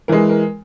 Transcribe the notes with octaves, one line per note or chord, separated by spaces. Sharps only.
E3 G#3 A#4
A#4